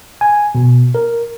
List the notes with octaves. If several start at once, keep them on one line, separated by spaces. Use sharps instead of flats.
G#5
B2
A#4